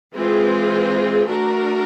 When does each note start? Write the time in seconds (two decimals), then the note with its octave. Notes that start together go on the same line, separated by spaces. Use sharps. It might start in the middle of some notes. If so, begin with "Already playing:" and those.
0.15 E3 G#3 C4 F4 G#4
1.27 A3 D4 F#4 A#4